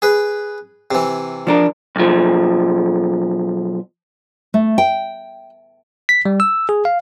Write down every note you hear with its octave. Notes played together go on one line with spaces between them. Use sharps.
G#4 B4
C3 E3
F3 D4 A#4
B1 F3
A3
G5
B6
G3
E6
G#4
F5